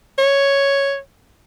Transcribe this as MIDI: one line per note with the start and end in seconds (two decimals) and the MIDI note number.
0.19 0.98 73